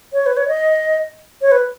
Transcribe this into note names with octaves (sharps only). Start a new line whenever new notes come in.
C#5
B4
C#5
D#5
C#5
B4